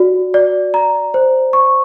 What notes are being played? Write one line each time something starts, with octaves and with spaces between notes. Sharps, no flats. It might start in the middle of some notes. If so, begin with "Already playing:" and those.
Already playing: F#4 D5
D5
A#5
C5
C#6